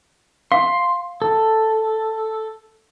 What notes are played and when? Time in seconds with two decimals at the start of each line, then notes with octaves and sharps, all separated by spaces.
0.52 F5 C6
1.22 A4